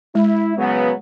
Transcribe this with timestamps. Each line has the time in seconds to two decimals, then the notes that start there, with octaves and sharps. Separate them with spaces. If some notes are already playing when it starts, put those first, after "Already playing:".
0.15 G#3 E4
0.57 C#3 F#3 B3